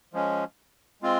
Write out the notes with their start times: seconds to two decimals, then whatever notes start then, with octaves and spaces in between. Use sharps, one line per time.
0.13 F3 G#3 C#4
1.02 G#3 C4 F4